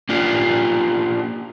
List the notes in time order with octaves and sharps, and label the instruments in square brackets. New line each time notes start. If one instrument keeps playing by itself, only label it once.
[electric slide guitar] A#3 D4 F4 G4